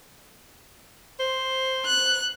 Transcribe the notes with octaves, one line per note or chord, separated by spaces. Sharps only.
C5
F#6